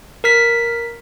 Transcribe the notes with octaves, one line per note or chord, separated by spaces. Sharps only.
A#4 F6 B6